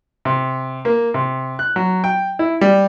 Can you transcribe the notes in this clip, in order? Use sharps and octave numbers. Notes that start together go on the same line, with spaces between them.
C3
A#3
C3
F#6
F#3
G5
E4
G3